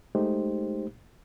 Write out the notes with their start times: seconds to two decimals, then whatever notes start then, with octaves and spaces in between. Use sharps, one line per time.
0.15 G#3 A3 D#4 G4 C5